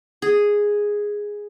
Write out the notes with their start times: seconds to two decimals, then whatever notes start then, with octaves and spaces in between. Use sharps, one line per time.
0.22 G#4